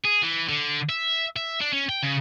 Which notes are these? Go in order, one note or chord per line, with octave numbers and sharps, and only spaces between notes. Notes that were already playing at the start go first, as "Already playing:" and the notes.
G#4
E3
D3
E5
E5
D4
C#4
G5
C#3